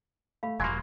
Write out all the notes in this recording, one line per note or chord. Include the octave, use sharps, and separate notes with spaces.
A3 F5 B5
E1 F#3 A#3 G#5 B5 C6 G#6